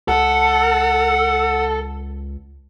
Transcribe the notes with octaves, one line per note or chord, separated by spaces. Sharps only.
C#2 A4 F#5